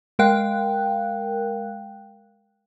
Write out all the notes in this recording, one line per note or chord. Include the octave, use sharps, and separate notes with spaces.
G#3 A#4 F5 G5 F#6